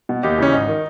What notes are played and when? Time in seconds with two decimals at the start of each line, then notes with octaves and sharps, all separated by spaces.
0.09 B2
0.23 D#2 D#4 G4
0.38 C#3 E3 C#4
0.53 G#1 D#4
0.68 D#3